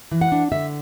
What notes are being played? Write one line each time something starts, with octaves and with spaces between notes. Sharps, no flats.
E3
F#5
D4
D3 E5